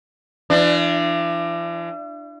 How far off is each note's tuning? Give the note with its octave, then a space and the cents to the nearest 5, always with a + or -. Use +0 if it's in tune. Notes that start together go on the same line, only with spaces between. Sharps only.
E3 +45 D4 +15